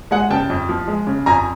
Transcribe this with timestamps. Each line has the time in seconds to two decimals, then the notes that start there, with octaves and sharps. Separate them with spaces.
0.11 G#3 F#5 G#5
0.30 C#3 G5 A5
0.50 F2
0.69 F3
0.88 G#3
1.07 C#3
1.26 F2 G#5 A#5